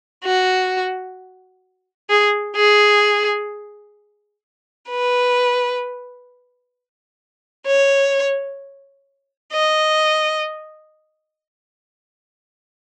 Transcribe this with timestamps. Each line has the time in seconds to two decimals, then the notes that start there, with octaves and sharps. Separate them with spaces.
0.24 F#4
2.10 G#4
2.56 G#4
4.89 B4
7.67 C#5
9.53 D#5